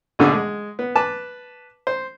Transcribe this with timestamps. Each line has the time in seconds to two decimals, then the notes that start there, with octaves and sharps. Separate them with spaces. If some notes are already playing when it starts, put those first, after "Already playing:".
0.19 A#1 B2 D3 D4 G#4 E6
0.33 G#3
0.79 B3
0.95 B4 A5 D6
1.87 C5